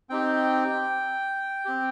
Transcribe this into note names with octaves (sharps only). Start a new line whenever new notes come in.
C4 D#4 G4 G5
C4 G4